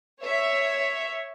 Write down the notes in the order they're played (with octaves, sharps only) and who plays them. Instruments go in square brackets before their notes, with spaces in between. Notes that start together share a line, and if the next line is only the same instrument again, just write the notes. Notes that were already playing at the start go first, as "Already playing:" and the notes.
[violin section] C#5 E5